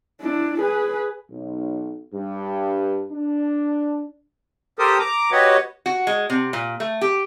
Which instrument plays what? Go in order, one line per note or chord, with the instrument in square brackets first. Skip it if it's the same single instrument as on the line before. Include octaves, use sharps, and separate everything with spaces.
[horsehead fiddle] D4 E4
G#4 B4
[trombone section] B1
G2
D4
[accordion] G4 A4 A#4 C5 D#6
A#5 D6
F#4 G4 B4 C#5 D#5 F#5
[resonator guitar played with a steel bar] F#4
G#3
C3
A#2
A3
G4